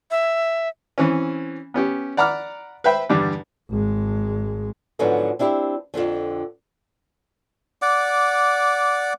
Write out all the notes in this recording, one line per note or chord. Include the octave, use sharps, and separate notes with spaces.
E5
E3 C4 C#4
B3 C#4 G4
D5 F#5 A#5 B5 D6 F6
B4 C5 E5 G5 B5
E2 G2 D3 G3
G#1 G#3
G#2 D3 F3 F#3 B3 D#4
C4 D4 E4 F4 G4
F2 B2 D3 F3
D5 F#5 D6